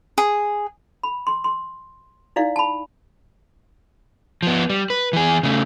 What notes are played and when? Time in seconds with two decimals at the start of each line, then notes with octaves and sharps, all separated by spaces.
0.18 G#4
1.03 B5
1.27 C6
1.44 C6
2.36 D#4 E4 D5 F5
2.56 A5 B5
4.43 F3 B3
4.70 G3
4.90 B4
5.13 E3 G#4
5.43 C#3 A3